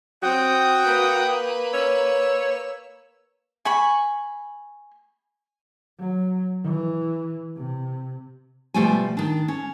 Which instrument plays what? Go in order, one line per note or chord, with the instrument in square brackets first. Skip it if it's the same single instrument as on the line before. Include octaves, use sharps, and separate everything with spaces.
[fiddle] C4 [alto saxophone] F#4 [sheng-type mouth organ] G5 D#6
[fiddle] A#3 B4
[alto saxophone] C#5 [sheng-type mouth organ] E6
[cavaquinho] G#5 B5 C#6
[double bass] F#3
E3
C3
[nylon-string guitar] B2 F3 G3 A3 G5 G#5
D#3 D4
C#4